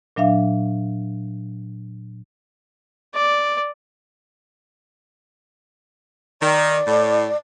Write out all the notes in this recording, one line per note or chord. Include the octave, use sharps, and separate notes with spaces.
A#2 F#3 D4 E5 F5
D5
D#3 D5
A2